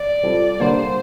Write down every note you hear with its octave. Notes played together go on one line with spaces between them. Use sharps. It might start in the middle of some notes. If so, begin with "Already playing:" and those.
Already playing: D5
G3 C4 F4 A4
D3 G3 A#3 C5